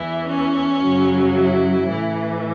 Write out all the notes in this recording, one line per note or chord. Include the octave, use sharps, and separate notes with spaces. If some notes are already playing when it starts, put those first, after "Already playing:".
Already playing: E2 E3 E4
C#4
F#2 C#3 F#3
E4
A2 E3